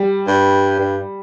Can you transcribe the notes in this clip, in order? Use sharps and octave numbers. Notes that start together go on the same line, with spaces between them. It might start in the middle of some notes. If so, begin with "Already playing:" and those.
Already playing: G3
G2
G2